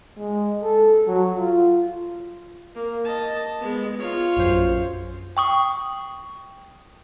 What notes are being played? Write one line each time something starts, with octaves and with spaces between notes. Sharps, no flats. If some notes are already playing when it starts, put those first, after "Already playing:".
G#3
A4
F#3
F4
A#3
D#5 A5
G#3 B3
F4 C#5
A#1 F#2 C5
G5 C#6 D#6